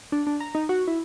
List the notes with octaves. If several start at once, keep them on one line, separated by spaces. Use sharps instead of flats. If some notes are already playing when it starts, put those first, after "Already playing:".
D4
D4
A#5
D#4
F#4
E4